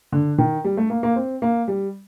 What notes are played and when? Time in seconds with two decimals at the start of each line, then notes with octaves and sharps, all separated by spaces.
0.12 D3
0.38 D#3
0.64 G3
0.77 A3
0.90 A#3
1.03 A#3
1.16 C4
1.42 A#3
1.68 G3